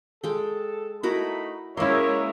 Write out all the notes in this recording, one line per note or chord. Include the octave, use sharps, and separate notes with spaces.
G#3 A4 G5
A3 D#4 E4 F#4 A#4 B5
G#3 A#3 C#4 E4 A#4 C#5 E5 C6